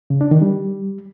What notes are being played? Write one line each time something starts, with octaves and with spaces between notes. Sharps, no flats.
C#3
D4
D#3
G3